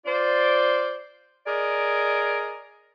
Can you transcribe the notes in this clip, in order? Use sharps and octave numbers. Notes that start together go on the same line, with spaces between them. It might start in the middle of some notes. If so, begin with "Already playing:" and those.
F4 C5 D5
G#4 A#4 D5 D#5